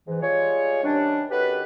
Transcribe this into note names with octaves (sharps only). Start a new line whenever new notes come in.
G#2 E3
G3 G#3 F4 G#4 C#5
C3 D#3 G3 C#4 D4
D#3 C#4 F#4 G4 A4 B4